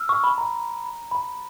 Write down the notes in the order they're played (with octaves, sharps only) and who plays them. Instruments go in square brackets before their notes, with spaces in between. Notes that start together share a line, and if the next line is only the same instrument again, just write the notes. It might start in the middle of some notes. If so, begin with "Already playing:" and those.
Already playing: [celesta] E6 F6
C#6
B5
A#5
B5